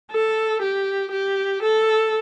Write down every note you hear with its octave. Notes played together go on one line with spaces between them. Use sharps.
A4
G4
G4
A4